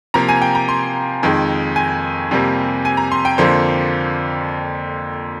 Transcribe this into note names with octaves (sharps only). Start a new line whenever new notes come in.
C3 F3 A#3 A#5
G#5
G5
A#5
C6
F2 D#3 G#3
G#5
F2 C3 G3 A#3
G#5
A#5
C6
G5
F2 D3 F3 A#3 C5